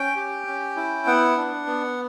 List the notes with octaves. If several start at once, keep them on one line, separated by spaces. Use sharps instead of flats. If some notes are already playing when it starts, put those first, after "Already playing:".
Already playing: C#4 G5
G4
C#4
E4
B3 F#5
D4
B3